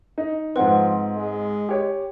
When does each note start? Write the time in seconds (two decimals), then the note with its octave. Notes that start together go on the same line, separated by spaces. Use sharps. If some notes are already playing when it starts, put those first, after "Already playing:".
0.18 D#4
0.56 G#2 F3 C4 B4 F#5
1.15 G#3
1.69 G4 C#5